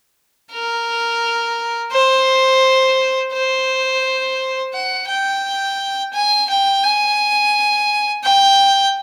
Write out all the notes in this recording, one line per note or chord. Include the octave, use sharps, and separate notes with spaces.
A#4
C5
C5
F#5
G5
G#5
G5
G#5
G5